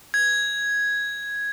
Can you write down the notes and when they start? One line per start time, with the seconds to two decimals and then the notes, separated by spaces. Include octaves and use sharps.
0.14 G#6